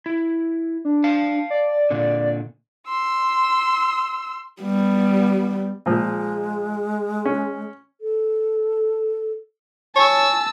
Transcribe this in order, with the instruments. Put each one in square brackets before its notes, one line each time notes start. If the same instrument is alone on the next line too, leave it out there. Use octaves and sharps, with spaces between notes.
[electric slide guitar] E4
[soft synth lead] D4
[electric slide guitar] F5 A5
[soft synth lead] D5
[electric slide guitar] A#2 D3
[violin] C6 E6
[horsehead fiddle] G3 B3
[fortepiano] A#2 F3 [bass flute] G#3
[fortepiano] C#4
[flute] A4
[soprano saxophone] C#5 [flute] G#5 [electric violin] A5 E6